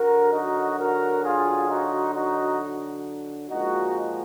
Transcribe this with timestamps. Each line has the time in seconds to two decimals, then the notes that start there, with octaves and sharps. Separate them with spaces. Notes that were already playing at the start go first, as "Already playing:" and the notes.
Already playing: D3 F#3 F#4 A#4
0.32 D#4 F#4
0.78 F#4 A#4
1.23 F4 G#4
1.69 D#4 F#4
2.13 D#4 F#4
3.49 A#2 F3 G#3 D#4 F#4